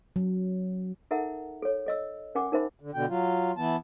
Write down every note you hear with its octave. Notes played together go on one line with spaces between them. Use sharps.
F#3
D#4 A4 A#4 E5 F#5 A#5
A4 C#5
A4 D#5 E6
C#4 A#4 F#5 G#5 D6
D#4 A#4 C5 E5 B5
D3
B2 D3 G5
F#3 F4
E3 B3 A5